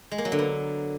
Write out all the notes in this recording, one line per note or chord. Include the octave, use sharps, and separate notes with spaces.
G#3
A#3
F#3
D3
B3